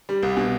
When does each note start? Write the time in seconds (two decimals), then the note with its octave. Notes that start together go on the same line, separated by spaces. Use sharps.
0.09 G3
0.23 C2
0.37 B2